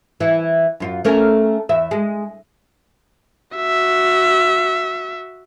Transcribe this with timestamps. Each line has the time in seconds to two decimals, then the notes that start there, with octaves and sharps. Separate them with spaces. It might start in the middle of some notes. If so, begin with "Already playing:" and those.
0.20 E3 E4
0.80 F#2 F4
1.05 A3 C#4 A#4
1.69 E2 E5
1.91 G#3
3.56 F#4 E5